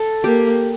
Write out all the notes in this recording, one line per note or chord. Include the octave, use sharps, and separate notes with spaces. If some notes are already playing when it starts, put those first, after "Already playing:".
Already playing: A4
A#3 G4